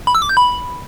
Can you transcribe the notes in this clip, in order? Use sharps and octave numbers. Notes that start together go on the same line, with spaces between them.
B5
E6
D6
G6
B5